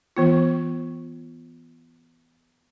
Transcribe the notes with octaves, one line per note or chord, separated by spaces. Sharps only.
E3 B3 F4